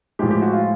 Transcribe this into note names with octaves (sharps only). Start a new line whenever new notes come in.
A2 F3 G#3 G4
G4
F#4
F4